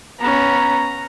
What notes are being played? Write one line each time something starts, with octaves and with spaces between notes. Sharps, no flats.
B3 C#4 A#5